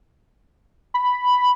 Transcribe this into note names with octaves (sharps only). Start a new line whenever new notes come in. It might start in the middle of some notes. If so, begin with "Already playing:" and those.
B5